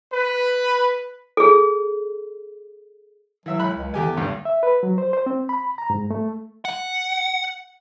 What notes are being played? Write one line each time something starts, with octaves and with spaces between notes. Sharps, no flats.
B4
G#4 A4
E3 F#3 E5 E6
B1 B5 F#6
C#2
E2 D3 G4 G#5
G#1 D2 G2
E5
B4
F#3
C5
C5
C4
B5
A#5
G#2
A3
F#5